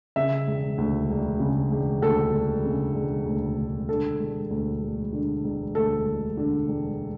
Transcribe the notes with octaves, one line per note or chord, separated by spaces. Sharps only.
C#3 E5
E1
D2
E1
C#3
E1
D2 A4
E1
C#3
E1
D2
E1
D3 A4
E1
D2
E1
D3
E1
D2 A4
E1
D3
E1